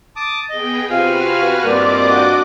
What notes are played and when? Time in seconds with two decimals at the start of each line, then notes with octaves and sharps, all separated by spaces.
0.16 A5 D6 D#6
0.49 B3 G#4 D#5 G5
0.90 C3 C4 F4 F#4 B4 F5 G#5 F6
1.64 G2 A#2 A#3 C4 D5 D#5 D6
2.09 D4 F#4